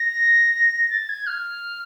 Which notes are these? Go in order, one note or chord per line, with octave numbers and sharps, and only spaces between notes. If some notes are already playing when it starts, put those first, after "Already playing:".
Already playing: A#6
A6
G#6
F6